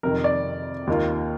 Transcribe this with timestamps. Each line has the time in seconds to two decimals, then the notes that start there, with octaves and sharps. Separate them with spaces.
0.03 F2 C3 D#3 A#4
0.24 D5
0.87 D#2 D#3 A#3 F4